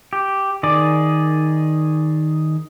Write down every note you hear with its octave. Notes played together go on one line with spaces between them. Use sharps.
G4
D#3 G#4 D5